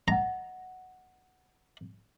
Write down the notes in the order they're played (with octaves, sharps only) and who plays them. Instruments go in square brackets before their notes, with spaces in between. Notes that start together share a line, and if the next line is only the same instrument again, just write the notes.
[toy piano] D#5 F#5 [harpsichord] A#5